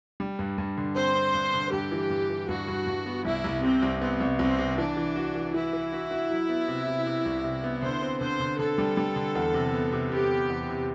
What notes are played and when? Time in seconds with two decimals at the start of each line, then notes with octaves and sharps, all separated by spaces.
0.20 G3
0.39 G2
0.58 G2
0.77 D3
0.96 C4 C5
1.15 C4
1.34 G2
1.54 D3
1.72 G2 G4
1.92 E3
2.10 G2
2.30 E3
2.48 G2 F#4
2.68 G2
2.87 G2
3.06 B3
3.25 C2 E4
3.44 C2
3.63 C3 C4
3.83 C2
4.01 B3 C4
4.21 C2
4.39 C2 C4
4.58 C3
4.77 E3 D4
4.97 E3
5.16 F#4
5.35 E3
5.53 E3 E4
5.73 E3
5.92 F#4
6.11 F#4
6.30 F#3
6.49 B3
6.68 C3
6.87 C3
7.06 C3
7.25 C2
7.44 C3
7.64 B3
7.82 D3 C5
8.02 C4
8.21 D3 C5
8.40 D3
8.58 D3 A4
8.78 G3
8.97 G3
9.16 D3
9.35 E2
9.54 C3
9.73 B3
9.93 C3
10.12 B3 G4
10.31 B3
10.50 E2
10.69 C3